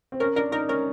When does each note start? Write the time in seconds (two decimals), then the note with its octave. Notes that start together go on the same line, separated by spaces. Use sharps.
0.12 C4
0.20 C#4 A#4
0.36 D4 A#4
0.52 D#4 A#4
0.69 C#4 A#4